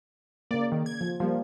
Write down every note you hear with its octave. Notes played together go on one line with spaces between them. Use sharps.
C#3 A#3 D5
D#3
G#6
F3
F3 G3 A#3